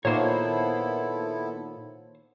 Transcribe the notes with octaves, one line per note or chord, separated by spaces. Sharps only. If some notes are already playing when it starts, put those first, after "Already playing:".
A#2 D#3 A#3 B3 E4 A4 C5 C#5